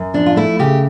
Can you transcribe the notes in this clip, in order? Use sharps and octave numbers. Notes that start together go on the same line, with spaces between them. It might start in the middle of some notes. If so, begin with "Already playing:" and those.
Already playing: F#2
F3 D4
F4
A3 E4
C#3 G4